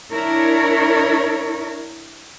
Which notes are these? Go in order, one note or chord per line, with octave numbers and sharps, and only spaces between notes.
D4 E4 A#4 C#5